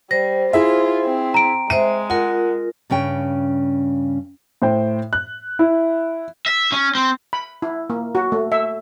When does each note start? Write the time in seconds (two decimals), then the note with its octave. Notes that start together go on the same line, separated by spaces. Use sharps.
0.11 G3 C5 A#6
0.53 E4 F4 G#4 E5
1.05 C4
1.34 A#5 D7
1.70 G#3 C5 E5 D#7
2.10 F4 A#4 F#5
2.90 G2 C#3 C#4 G5
4.62 A2 C5 G5
5.13 F#6
5.59 E4
6.46 E5
6.72 C#4
6.95 C4
7.33 B5
7.62 E4
7.90 A#3
8.15 F#4
8.32 A3
8.52 E5